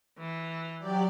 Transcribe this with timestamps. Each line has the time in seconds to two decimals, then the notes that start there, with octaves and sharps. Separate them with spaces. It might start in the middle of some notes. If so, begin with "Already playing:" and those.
0.18 E3
0.78 F#3 G4 D5